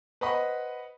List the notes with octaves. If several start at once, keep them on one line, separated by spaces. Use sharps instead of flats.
B4 C5 D#5 F#5 B5